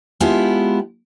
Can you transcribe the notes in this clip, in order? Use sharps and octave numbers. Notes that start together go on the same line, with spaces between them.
G#3 B3 D4 E4 F4 G4